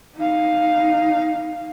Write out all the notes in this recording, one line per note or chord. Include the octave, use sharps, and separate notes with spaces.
D#4 F5